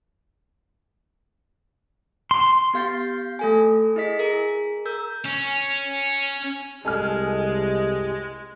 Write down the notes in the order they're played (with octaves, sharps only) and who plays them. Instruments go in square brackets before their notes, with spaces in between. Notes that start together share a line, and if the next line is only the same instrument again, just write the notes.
[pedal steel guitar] C6
[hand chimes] B3 G4 F5 G6 A6 C7
A3 A4 G#5
E4 G#4 D#5 B6
G#4 A#4
A#4 E6 G6
[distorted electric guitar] C#4
[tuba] C2 [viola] G#3 [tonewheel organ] G4 D#5 [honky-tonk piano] A4 G#5 F6